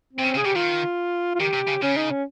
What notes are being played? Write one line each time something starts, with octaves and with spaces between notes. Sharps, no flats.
C4
C3
C#3
C#3
G#4
C#3 G4
D#3 F4
F4
D#3 G4
C3
C#3
C#3 C#4
D#4
C#4